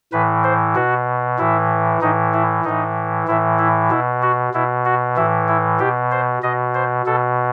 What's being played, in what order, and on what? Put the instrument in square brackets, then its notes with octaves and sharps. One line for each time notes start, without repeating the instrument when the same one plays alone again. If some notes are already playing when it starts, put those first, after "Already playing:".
[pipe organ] A2 E3 B4
C5
B2 F#4
A2 E3 E4
A2 E3 D#4
E4
A2 E3 D#4
A2 E3 E4
E4
B2 E4
F#4
B2 E4
F#4
A2 E3 E4
E4
B2 G4
C5
B2 D#5
C5
B2 A4